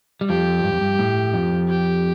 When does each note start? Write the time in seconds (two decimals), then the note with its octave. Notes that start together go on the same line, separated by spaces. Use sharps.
0.21 G3
0.29 F2 F3 G4
0.64 G2
0.72 F2
0.81 G2
0.99 A2
1.33 F2 F3
1.68 G4